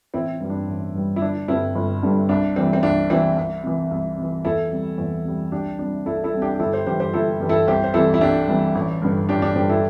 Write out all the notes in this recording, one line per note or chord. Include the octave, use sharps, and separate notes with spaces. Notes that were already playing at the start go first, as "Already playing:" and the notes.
A1 C4 E4
G2 G3
D4
A1
G2 G3
E4
G1 D4
G2 D3 G3 C4 E4
G1
G2 D3 G3
C2 D4
C3 E3 G3 C4
C4
C2 D4
C3 E3 G3 C4 E4
C2
C3 E3
C2
C3 E3
E2 E4 A4
C3 G3
E2
C3 G3
C2 D4 G4
C3 G3 D4
C2 E4 A4
E4 A4
C3 G3
D4 G4
G4
G1 E4 A4
G4 C5
G2 E3 G3 G4 C5
G4 C5
G1 E4 A4
G2 E3 G3
E4 A4
C2 G4 C5
C5
C3 E3 G3 E4 A4
E4
C2 D4 G4
C3 E3 G3
A1
G2 D3
A1 D4 G4
D4 G4
G2 D3 G4 C5
E4 A4